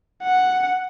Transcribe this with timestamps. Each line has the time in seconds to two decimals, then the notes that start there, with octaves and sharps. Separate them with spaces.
0.23 F#5